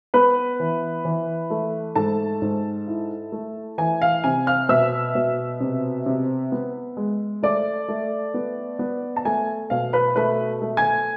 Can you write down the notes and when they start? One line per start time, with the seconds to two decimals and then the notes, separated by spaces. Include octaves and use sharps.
0.14 B3 B4 B5
0.60 E3
1.05 E3
1.50 A3
1.96 G#2 A4 A5
2.42 G#2
2.88 E4
3.32 A3
3.78 E3 G#5
4.02 F5
4.24 C3 G#5
4.47 F5 F6
4.69 B2 E5 E6
5.15 B2
5.61 C3
6.06 C3
6.52 B3
6.97 G#3
7.43 A3 D5 D6
7.88 A3
8.34 B3
8.79 B3
9.16 A5
9.25 A3 G#5
9.70 B2 F5
9.93 B4 B5
10.16 A3 B4 B5
10.62 A3
10.77 G#5 G#6